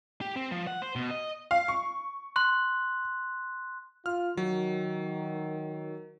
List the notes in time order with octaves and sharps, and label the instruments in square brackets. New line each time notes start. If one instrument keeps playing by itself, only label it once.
[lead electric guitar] G4
C4
F3
F#5
C5
B2
D#5
[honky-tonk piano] F5
C#6
[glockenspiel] C6 F#6
[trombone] F4 [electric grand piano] F6
[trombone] D#3 [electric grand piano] F#3